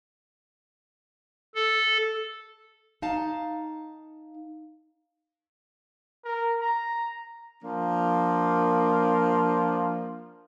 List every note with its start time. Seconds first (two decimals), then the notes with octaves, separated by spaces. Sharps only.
1.55 A4
3.02 D#4 F5 A5
6.24 A#4
6.61 A#5
7.62 F3 A#3 D4